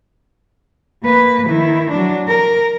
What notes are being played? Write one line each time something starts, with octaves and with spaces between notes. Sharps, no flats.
A#3 B4
D#3 E4
F#3 D4
A#4